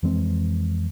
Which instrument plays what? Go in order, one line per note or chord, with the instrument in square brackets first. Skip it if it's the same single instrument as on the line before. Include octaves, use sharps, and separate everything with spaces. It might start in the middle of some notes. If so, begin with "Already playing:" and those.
[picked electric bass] F2 E3 G#3 C4